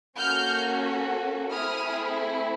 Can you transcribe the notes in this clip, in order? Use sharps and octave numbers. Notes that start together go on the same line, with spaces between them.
A#3 C#4 F#4 A4 F6 G6
A3 C4 E4 G#4 D#6 F6